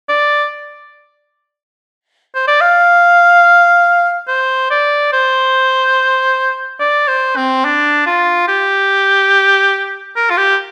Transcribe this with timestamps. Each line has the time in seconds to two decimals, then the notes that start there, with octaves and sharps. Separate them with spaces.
0.09 D5
2.35 C5
2.48 D5
2.61 F5
4.28 C5
4.71 D5
5.13 C5
6.80 D5
7.08 C5
7.37 C4
7.65 D4
8.06 F4
8.48 G4
10.16 A#4
10.30 F4
10.37 G4